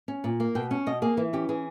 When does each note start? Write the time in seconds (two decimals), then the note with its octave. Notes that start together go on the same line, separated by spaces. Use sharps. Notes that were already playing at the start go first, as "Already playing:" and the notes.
0.08 C#4
0.24 A#2
0.40 A#3
0.55 B2 G5
0.71 C#4
0.86 B2 D#5
1.02 A#3 G#4
1.17 E3 E4
1.33 C#4 G4
1.49 E3 G#4